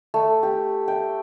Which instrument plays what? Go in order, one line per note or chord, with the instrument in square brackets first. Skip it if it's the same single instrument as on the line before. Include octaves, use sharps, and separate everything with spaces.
[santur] A3
G4
G5